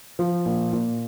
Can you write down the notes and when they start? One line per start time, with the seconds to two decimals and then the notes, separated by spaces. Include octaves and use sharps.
0.19 F3
0.46 A#2
0.73 A#2